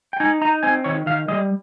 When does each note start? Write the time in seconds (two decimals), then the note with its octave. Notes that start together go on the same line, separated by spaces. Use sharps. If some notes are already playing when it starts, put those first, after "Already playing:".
0.13 G5
0.20 D#4 G#5
0.42 D#4 A#5
0.63 C4 G#5
0.84 D#3 C#5
1.06 D#3 F5
1.28 G3 D#5